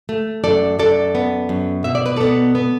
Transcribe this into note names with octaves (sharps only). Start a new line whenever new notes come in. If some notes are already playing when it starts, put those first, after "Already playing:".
A3
F#2 A4 D5
F#2 A4 D5
B3
F#2
B2 E5
D5
B4
B3 A4 D5
B3